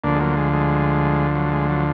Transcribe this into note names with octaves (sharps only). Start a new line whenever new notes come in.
D2 D3 F3 A#3 D4
G#3
F#3 A#3
G#3
G#3
F#3
G#3
F#3